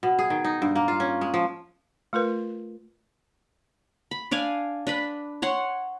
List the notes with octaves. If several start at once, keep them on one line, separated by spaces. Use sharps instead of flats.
B2
G#4
D#3
D#4
G2
A#3
F4
C#4
G#3
F3
A3 F4 A#4 B4
B5
D4 D5 F5 G#5
D4 B4 B5
C#5 F#5 C6